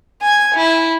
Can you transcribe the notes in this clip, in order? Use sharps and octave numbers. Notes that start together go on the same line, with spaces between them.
G#5 G#6
E4